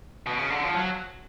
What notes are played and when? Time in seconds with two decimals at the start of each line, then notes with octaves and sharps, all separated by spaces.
0.27 B2
0.39 C#3
0.50 D3
0.63 F3
0.75 F#3